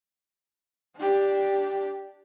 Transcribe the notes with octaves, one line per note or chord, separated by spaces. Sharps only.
D4 G4